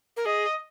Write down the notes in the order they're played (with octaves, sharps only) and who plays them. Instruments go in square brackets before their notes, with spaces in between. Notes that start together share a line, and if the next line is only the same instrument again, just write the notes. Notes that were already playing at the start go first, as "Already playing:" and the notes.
[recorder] A#4
[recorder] G#4 [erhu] D#5